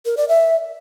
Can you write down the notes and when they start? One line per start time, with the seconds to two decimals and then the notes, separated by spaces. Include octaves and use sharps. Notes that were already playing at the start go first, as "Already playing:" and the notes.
0.05 A#4
0.17 D5
0.28 E5